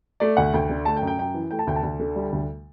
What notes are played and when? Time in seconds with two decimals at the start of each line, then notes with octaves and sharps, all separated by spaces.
0.20 A3 D5
0.37 D2 F#5
0.54 D2 G5
0.70 D3
0.85 A3 A5
0.97 G5
1.02 F#2
1.07 G5
1.18 F#2 G5
1.34 E3
1.51 A3 G5
1.59 A5
1.67 D2 G5
1.76 A5
1.83 D2
1.99 D3
2.16 G3
2.32 D2